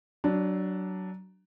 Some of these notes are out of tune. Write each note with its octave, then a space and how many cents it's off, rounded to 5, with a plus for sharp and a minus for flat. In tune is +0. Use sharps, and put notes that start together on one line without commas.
F#3 +20 D4 +0